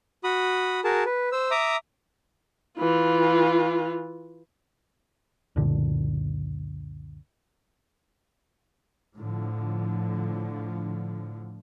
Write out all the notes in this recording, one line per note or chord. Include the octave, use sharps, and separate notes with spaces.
F#4 B5 D#6
F#4 G#4 A#4 A5
B4
C5 E6
E5 A#5 D6 D#6
E3 F4
C#2 F#2 A#2 D3
A2 D3 F3